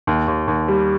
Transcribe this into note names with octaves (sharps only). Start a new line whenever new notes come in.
D#2
D#2
D#2
G3